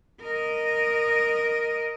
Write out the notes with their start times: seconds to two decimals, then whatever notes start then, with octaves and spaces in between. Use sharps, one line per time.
0.22 A#4 D#5